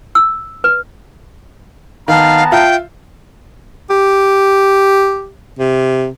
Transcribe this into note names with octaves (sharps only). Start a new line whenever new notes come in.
E6
B4
D#3 B3 F5 A5 A#5
F4 E5 F5 G5
G4
C3